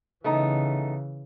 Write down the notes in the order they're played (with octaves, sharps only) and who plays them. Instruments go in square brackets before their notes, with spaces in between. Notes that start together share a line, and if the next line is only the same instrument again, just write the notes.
[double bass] C#3 E3 [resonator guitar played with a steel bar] A3 B3 D#4